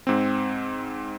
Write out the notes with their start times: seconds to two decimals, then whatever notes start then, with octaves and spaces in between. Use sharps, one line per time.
0.07 G#2 C4